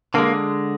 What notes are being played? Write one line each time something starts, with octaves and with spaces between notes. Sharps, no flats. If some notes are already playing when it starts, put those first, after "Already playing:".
D3 G#3 A#3